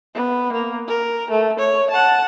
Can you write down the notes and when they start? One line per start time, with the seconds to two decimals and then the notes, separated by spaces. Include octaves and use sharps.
0.15 B3
0.52 A#3
0.88 A#4
1.31 A3
1.59 C#5
1.90 F#5 A5